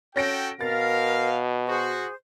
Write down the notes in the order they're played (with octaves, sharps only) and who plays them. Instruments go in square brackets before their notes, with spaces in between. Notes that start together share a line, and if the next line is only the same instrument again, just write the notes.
[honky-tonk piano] C#4 A#6 D7 [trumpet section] F#4 A4 G5
[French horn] B2 [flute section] A#4 [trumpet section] F5 [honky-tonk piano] A6
[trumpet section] F#4 [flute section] G#4 C5